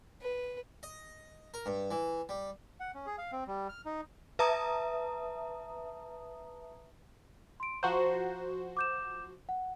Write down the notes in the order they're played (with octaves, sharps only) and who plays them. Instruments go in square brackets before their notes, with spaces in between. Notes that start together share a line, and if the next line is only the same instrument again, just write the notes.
[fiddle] B4
[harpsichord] D#5
A#4
G2
E3
G3
[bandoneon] F#5
C#4
G#4
F5
C4
G3
F6
D#4
[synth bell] B4 E5 A5 A#5 D#6
[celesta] C6 D7
[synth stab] F3 F#4 C5 [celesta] A#5
[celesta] D6 G6 E7
F#5